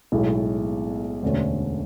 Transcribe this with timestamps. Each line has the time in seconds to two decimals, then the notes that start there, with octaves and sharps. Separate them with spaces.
0.12 B1 A2 G#3
1.23 E1 D2 D3 A3 C#4